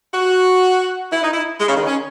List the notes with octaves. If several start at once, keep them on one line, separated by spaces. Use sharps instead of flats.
F#4
E4
D#4
E4
G#3
C#3
D#3
C#4